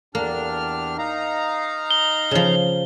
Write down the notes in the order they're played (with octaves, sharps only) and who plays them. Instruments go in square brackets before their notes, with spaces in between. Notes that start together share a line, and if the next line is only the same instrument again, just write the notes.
[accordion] E2 D4 F6 [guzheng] A#3 [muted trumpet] G4
[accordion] D#4 F5 A#5 [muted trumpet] D#5
[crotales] G7
[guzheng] C#3 F3